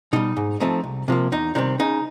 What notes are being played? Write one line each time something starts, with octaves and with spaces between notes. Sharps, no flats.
B2 G3 D#4
G#2
F3 A3 C4 D#4
C2
C3 F3 A#3
E2 D#4
C3 D#3 G3 C4 D#4
C#3 D#4